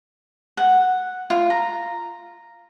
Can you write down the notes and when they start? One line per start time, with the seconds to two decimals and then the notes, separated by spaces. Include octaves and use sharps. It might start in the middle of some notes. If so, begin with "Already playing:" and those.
0.57 F#5
1.30 F4
1.50 A#5